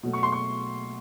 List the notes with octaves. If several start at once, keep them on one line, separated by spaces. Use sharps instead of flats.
B2 F#3 A3
C#6
C6
C#6